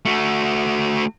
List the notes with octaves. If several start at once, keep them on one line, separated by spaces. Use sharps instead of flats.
A3 F#4